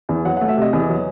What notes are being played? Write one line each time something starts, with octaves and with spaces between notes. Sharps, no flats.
E2
F#3 F#5
A3 F#5
E5
C3 D#5
E2
F#3